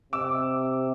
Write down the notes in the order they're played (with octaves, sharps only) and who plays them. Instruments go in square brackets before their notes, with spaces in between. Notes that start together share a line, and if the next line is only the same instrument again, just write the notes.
[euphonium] C3 [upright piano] D6 E6